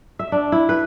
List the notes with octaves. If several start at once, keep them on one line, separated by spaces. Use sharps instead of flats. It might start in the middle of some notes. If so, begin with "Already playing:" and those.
E5
D4
E4
B4